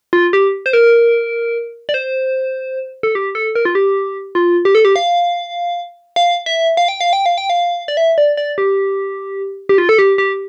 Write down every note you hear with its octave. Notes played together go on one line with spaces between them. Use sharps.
F4
G4
C5
A#4
D5
C5
A4
G4
A4
A#4
F4
G4
F4
G4
A4
G4
F5
F5
E5
F5
G5
F5
G5
F5
G5
F5
D5
E5
D5
D5
G4
G4
F4
A4
G4
G4